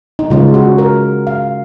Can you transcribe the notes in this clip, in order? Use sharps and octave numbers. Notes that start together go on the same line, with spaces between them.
D#4
C#3 G#3 C#4 F4
F#4
A#4
F5